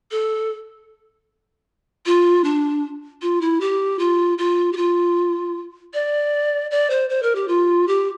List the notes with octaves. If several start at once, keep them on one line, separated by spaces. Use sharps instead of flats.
A4
F4
D4
F4
E4
G4
F4
F4
G4
F4
D5
D5
C5
C5
A#4
G4
F4
G4